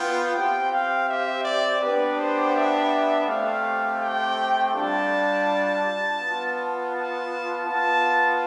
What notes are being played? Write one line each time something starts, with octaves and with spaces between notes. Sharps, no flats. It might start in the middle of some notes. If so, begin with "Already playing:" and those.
Already playing: B3 F4 G5
C4 G4 G5
F5
E5
D5
B3 D4 G4 B4
C5
E5
A3 C4 G4 F5
G5
G3 D4 F4 A5
B3 F4
A5
B3 F4 A5